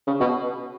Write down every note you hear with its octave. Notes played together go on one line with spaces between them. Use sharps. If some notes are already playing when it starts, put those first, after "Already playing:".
C#3
B2